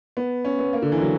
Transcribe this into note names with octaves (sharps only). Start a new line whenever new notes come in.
B3
C#4
B3
A#3
D3
E3
F#3